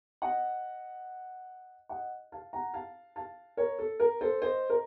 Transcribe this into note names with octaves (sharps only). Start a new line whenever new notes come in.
D#5 F#5
D#5 F#5
F5 A5
F#5 A#5
F5 A5
F5 A5
A#4 C#5
A4
A#4
A4 C5
C5 D#5
A#4